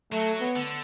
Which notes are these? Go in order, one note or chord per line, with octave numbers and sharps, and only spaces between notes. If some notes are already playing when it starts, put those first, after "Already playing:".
F#3 A3
B3
D3